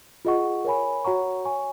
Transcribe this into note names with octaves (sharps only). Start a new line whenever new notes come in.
F4 G#4 D#5 F#5 C#6
A#4 C#5 G#5 B5
F#4 C#5 F#5 A#5 C#6
C#5 G#5 C#6